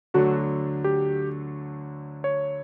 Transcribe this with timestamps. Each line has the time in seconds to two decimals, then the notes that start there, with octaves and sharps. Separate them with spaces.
0.14 D2 D3 F#3 A3 D4 F#4
0.84 G4
2.24 C#5